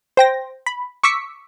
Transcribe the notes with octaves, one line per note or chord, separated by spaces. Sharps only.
C5 G5 A#6
B5
C#6 D6 E6 B6 C#7